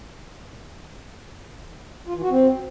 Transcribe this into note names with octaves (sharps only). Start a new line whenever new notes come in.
F4
E3
F#4
C4